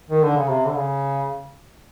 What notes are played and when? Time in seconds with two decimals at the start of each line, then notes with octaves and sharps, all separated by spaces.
0.10 D#3
0.23 D3
0.36 C#3
0.50 C3
0.67 D3
0.75 C#3